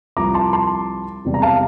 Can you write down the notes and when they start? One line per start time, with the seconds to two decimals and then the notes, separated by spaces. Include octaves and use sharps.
0.17 C2 C3 F3 A#5 D6
0.34 A5 C6
0.53 A5 C6
1.25 E1 E2 C3 E3 G3
1.34 A#5
1.42 F5 A5